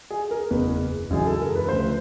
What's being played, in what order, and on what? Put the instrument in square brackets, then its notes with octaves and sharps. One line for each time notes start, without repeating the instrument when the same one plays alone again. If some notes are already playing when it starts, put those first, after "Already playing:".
[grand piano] G#4
A#4
F#1 E2 C#3 B4
G#1 F#2 C#3 E3 G#4
A4
A#4
B4
D2 C#3 F3 C5